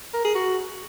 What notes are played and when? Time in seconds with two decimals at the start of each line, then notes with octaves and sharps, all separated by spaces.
0.14 A#4
0.24 G#4
0.35 F#4